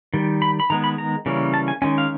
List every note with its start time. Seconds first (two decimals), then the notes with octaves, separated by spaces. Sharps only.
0.14 D#3 G3
0.42 B5
0.60 B5
0.70 D#3 G#3 B3 A#5
0.84 B5
0.98 A#5
1.26 C#3 E3 G3 A#3 C#4
1.54 A5
1.68 G#5
1.82 D#3 G#3 C#4 G#5
1.98 F5